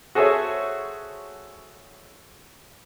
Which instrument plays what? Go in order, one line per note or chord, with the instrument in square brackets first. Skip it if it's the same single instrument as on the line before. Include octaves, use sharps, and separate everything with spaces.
[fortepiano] F#4 G#4 A4 C5 C#5 E5